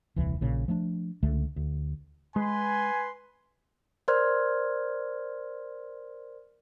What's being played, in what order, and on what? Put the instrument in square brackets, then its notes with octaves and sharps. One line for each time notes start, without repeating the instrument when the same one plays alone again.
[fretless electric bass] D#1 C2 E3
A#1 A#2 C#3
F3 A3 A#3 D4
C#2 D3 A3
D2
[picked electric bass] G#3 [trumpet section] B4 C6 [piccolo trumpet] G#5
[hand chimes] A#4 C5 D5 C6 F6 G#6